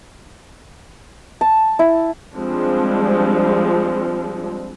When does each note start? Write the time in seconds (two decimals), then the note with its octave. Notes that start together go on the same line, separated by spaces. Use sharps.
1.41 A5
1.79 E4
2.35 F3 G3 G#3 C4 D4